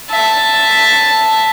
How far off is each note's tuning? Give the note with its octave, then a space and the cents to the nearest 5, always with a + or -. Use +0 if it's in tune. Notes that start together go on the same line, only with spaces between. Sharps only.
E5 +0 A5 +0